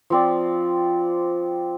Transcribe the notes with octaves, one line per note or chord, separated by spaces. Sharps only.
F3 C4 D5